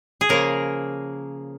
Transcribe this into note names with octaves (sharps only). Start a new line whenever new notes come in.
G#4
C#3 F3 A#3 A#4